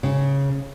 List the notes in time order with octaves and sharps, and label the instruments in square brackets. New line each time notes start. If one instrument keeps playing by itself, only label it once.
[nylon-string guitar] C#3